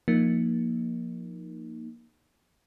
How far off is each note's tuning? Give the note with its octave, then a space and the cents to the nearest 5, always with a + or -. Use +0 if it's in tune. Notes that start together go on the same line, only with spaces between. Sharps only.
F3 +0 A#3 +5 D#4 +0